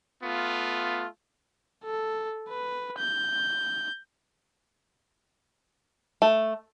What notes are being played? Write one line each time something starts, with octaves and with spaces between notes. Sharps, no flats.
A3 B3 F4
A4
B4
G6
A3